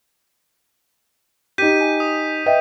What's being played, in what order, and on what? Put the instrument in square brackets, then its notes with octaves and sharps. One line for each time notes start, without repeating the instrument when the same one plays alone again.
[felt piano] D#4 G4 [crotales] G6 B6 D#7
[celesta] G#5
[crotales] D#6
[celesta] B4 D#5 E5 [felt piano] G5